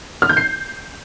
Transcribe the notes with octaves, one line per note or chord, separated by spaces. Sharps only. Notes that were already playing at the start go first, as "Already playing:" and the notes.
F6
G6
C7